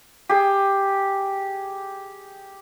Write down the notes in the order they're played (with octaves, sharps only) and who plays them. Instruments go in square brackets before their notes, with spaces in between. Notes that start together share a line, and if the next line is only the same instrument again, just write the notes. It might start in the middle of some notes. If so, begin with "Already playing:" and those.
[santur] G4 G#4